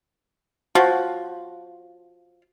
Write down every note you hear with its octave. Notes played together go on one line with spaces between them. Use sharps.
F3 F#4